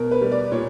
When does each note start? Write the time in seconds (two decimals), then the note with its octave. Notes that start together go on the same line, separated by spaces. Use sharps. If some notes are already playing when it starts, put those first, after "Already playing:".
Already playing: B2 A#4
0.11 B4
0.21 G3
0.32 D5
0.52 A#2 C#5